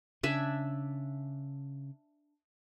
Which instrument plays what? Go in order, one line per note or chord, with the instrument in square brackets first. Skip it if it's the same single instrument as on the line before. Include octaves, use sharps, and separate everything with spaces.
[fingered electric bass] C#3 [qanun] D4 E5 G#5